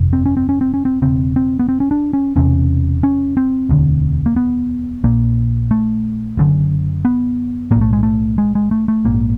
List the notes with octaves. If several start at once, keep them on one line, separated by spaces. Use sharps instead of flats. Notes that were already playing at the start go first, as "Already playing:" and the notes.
Already playing: G1 F2 C3
C4
C#4
C4
C#4
C4
C#4
C4
E1 D#2 C#3 C4
C4
B3
C4
C#4
D4
C#4
E1 E2 C3 C#4
C#4
C4
E1 D2 D3
A#3
B3
A#1 A#2 A#3
A3
F#1 F#2 D3
B3
B1 A2 A#3
A3
G#3
A3
G#3
G#3
A3
A3
A#1 G#2 A#3